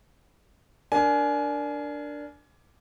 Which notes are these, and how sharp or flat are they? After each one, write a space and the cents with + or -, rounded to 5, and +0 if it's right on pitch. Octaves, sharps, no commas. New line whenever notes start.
D4 +0 A#4 +0 G#5 +25